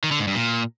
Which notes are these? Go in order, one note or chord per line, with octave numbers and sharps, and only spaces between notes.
D#3
D3
G#2
G2
A#2